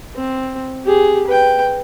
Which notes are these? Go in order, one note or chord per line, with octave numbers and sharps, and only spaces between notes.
C4
G4 G#4
B4 G5